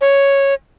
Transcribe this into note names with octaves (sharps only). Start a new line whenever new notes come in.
C#5